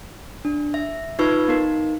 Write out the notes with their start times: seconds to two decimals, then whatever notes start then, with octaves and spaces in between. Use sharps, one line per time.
0.45 D4
0.74 E5
1.19 D#4 F4 B4 C#6 E6 G#6
1.48 B3 D#4 A#4